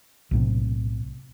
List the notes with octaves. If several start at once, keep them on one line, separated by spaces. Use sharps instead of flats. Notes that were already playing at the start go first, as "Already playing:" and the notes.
B1 A2 C3